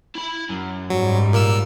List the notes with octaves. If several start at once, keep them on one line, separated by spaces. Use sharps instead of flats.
E4 B5
F#2
G#2 F#3 G3
A#2 A#3 E6